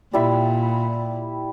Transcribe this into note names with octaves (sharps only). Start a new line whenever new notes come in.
A#2 G3 E4 E5